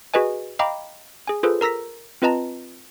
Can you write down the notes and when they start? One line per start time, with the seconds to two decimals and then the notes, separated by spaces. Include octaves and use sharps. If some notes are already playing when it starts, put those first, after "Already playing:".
0.14 F#4 G#4 B4 D#5 G#5
0.59 D#5 F5 G5 A#5 B5 D6
1.27 G#4 G#5
1.43 F4 G#4 A4 B4 C5
1.61 A#4 A#5 E6 A#6 B6
2.22 C4 F4 B4 D#5 A5 A#5